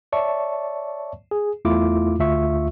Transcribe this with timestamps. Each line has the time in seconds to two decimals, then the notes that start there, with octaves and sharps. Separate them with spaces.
0.12 C#5 D5 E5 A5 C#6
1.31 G#4
1.65 E2 A3 E4 F4 D6
2.19 D2 F4 E5 C#6